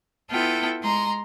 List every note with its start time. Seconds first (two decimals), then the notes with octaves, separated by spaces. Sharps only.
0.31 B3 E4 F4 A4 G5
0.83 G#3 A#5 C6